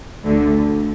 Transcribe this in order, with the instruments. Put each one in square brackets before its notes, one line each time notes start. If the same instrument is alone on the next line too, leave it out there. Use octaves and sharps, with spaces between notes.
[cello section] D2 D3